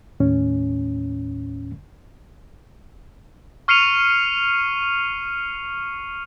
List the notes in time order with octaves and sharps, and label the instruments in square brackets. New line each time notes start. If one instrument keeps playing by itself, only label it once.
[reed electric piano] D#2 A2 C#4
[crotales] C#6 F6 C7 C#7 D#7 F7